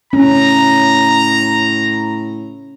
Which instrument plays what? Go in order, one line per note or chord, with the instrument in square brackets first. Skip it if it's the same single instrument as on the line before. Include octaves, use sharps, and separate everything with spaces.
[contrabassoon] A2 [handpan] C#4 [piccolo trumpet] A#5